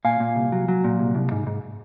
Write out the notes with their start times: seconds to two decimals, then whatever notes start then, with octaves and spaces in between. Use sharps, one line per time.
0.05 A#2 F5 G#5
0.20 A#2
0.36 C2
0.52 F#3
0.68 F#3
0.84 A#2
0.99 C2
1.15 C2
1.31 G#2
1.47 G#2